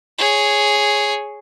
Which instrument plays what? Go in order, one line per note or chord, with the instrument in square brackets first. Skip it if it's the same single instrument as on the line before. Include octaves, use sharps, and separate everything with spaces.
[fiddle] G#4 C#5